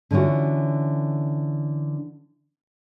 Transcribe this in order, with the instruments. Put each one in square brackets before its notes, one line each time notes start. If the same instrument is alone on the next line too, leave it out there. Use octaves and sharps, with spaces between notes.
[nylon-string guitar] D3 E3 C#4 F4 F#4